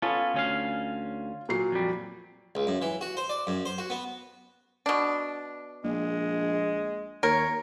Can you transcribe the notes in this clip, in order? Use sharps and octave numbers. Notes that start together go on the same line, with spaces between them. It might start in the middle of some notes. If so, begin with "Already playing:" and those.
B3 C#4 F4 A4
D2 C#4 F5
A#2 F#3 C7
F2 G3
C#2
F#2
E3
F#4
C5
D5
F#2
C5
F#4
B3
B2 D4
A#1 G#3
D#2 A#4 C#5